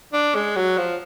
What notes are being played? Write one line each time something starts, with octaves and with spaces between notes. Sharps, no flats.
D4
G#3
F#3
F3